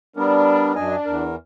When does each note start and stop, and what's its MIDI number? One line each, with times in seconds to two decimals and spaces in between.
0.17 0.75 55
0.17 0.75 59
0.17 0.75 62
0.17 0.75 70
0.75 0.96 42
0.75 1.26 62
0.75 0.96 75
0.75 0.96 80
1.06 1.35 40
1.06 1.35 70